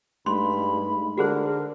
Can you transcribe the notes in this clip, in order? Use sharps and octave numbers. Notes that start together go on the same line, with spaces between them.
G2 G#3 A3 D#4 B5 C6
D3 F#4 G#4 A#4 C5